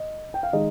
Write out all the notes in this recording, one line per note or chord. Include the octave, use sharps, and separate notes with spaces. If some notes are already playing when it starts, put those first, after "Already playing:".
Already playing: D#5
G5
F5
D#3 G#3 D#4 D#5